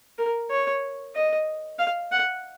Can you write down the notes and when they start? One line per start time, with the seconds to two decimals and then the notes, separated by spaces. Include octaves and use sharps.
0.18 A#4
0.50 C#5
1.15 D#5
1.79 F5
2.11 F#5